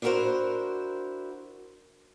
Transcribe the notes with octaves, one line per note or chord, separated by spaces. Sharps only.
D4 E4 F#4 A4 A#4 C5